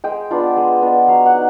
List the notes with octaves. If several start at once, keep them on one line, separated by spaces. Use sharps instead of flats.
G#3 G5
B3 D4 F4
G#3
B3 D4 F4
F#3 F5
F#5
D#4